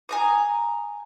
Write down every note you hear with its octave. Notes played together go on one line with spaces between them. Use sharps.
G#5 A#5 D#6